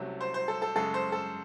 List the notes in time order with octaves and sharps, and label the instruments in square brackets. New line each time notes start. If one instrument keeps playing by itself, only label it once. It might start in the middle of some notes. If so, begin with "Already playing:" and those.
Already playing: [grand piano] C2 C3 F#3 A3 C#4
C5
C5
A4
A4
F#2 C#3 G#3 A4
C5
A4